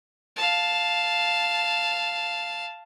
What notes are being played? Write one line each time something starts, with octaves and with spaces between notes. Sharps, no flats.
F5 A5